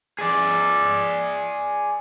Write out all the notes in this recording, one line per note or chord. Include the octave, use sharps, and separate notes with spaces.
G#4 D5